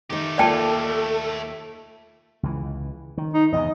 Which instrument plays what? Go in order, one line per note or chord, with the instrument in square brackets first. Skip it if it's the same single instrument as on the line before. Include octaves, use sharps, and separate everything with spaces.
[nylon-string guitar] D#3 D#4 [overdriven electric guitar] A3 G4
[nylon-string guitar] D#2 A#3 F4 [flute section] A4 [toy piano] D5 G5 A5
[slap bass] C#2 E3
D#3
[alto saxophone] D#4
[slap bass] E2 G#2 C3 [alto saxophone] D#5